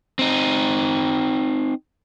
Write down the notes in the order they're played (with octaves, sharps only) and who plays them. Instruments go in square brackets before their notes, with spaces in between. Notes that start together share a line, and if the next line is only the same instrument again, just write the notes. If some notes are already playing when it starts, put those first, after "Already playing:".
[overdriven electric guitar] C4 D#4